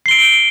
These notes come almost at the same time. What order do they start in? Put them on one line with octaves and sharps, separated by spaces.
C7 G7 D7